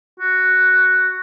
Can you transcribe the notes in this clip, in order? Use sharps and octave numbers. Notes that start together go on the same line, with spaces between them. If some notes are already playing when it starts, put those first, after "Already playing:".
F#4